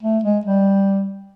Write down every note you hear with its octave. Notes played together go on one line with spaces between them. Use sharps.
A3
G#3
G3